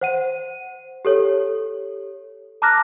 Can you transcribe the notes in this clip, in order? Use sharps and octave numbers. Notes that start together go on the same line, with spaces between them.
C5 F#5 D#7
G4 A4 C#5
A5 A#5 D6 F6 F#6 A#6